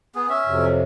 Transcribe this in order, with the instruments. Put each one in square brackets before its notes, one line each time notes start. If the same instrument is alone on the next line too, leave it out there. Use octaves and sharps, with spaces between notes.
[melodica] B3 G#4
C#4 E5
[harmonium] F2 C3 F#3